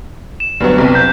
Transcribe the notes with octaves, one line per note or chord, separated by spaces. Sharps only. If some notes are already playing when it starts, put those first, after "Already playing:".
E7
D2 G2 F#3 B3
C2 F2
G6